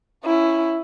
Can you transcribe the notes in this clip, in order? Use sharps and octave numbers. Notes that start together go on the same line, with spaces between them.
C#4 E4